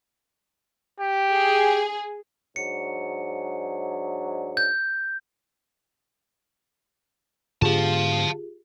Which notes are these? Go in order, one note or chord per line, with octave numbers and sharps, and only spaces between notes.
G4
G#4
G#2 F#3 D4 C#7
G6
G#2 D3 B3 F4 G4 G#4 F5 A5